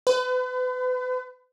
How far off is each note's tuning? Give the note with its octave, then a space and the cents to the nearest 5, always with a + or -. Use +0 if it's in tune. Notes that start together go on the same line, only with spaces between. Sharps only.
B4 +35